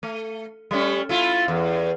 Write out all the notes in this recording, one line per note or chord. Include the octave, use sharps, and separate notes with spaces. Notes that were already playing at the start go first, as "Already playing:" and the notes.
A3
G3 A3 C#4
A3 E4 F4
E2